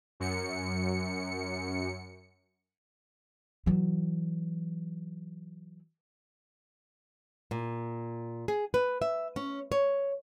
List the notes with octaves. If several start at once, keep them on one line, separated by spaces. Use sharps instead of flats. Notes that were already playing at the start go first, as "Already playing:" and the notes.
F#2 C#7
E3 F#3
A#2
G#4
B4
E5
C#4
C#5